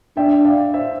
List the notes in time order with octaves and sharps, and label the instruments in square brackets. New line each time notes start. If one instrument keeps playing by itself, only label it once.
[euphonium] D4 [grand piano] E5 G5
[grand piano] D5 F5
C5 E5